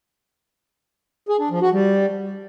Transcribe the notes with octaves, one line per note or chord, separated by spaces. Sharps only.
G#4
D4
F3
F#4
G3